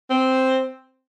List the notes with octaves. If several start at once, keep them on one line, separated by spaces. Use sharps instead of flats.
C4